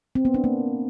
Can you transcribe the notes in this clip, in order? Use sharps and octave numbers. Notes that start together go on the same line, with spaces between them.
C4
B3
D4
A#3